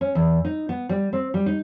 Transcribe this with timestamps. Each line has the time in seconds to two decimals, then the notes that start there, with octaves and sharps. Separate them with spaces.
0.01 C#4
0.15 E2
0.45 D#4
0.69 B3
0.89 G3
1.13 C4
1.34 G3
1.46 D#4